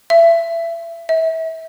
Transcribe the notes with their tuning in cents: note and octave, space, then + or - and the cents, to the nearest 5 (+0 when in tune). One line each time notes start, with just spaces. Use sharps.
E5 +30
E5 -30